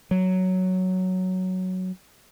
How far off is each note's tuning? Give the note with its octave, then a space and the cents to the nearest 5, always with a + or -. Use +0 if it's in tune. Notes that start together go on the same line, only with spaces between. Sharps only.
F#3 +5